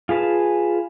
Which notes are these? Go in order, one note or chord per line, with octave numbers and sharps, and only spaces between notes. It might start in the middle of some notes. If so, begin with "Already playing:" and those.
F4 G#4 B4 A5